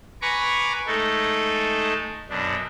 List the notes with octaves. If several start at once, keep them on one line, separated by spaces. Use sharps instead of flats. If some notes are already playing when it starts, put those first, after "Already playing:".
B4 G#5 A#5 B5 C#6 D6
G#3 A3 D#4 A4
F#2 B2 D4